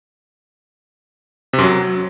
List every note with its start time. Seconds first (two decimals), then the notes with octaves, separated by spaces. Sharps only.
1.53 C3
1.58 F#2
1.63 F#3